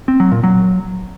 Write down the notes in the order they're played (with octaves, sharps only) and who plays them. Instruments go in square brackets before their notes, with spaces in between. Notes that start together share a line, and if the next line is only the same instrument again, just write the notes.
[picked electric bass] C4
F#3
A#2
F#3